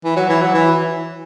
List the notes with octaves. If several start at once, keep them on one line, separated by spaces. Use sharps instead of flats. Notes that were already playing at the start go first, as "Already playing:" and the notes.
E3
F#3
E3
F#3
E3